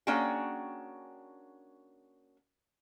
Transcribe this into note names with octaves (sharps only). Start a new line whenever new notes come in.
A#3 C#4 D4 F#4 G#4 G5